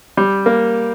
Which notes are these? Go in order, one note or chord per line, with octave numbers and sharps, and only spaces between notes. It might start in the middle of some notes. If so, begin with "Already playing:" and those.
G3
A#3